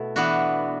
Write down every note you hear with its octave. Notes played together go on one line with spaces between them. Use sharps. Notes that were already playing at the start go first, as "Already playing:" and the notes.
Already playing: B2 A3 E4
E3 B3 D4 F#4